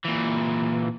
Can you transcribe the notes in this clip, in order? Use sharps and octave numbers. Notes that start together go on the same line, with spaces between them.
A#2 E3